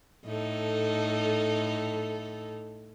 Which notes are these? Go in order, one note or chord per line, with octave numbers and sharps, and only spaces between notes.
A2 D#4 A4